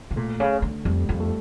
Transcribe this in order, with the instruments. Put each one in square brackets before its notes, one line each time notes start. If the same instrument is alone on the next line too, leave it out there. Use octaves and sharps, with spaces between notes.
[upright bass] C#3
[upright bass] A#2 [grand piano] A3
[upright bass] C#3
D3
[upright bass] F2 [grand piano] G3
[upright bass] F2
[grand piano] A3